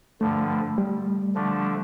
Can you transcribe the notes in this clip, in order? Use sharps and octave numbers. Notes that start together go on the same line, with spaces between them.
G2 D3 F3 A3
G3
D3 F3 A3 D4